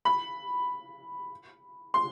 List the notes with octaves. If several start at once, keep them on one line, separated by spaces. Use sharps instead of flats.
B5
C6